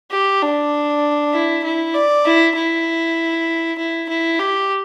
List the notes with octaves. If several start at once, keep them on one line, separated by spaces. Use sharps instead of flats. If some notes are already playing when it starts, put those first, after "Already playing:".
G4
D4
E4
E4
D5
E4
E4
E4
E4
G4